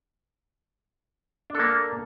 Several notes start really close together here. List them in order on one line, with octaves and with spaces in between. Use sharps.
D4 A4 A#3